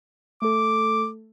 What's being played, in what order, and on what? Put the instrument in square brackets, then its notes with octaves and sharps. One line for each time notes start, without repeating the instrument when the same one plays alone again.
[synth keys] A3 A4 [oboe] D6